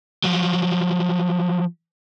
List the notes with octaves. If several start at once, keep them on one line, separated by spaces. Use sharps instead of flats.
F3 F#3